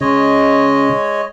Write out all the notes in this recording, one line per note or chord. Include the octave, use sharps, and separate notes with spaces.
C#3 G#3 C#5 D#5